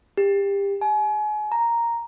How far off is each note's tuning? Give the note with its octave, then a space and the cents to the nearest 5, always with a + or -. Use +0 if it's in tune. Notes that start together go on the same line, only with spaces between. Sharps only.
G4 +25
G#5 +35
A#5 +0